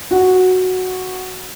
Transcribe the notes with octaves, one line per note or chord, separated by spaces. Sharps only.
F#4